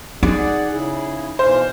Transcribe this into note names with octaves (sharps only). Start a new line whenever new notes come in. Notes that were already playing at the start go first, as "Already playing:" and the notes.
D#4 G#4 D5 F#5
C#3 E4 G#4
B2 E3 C5 F5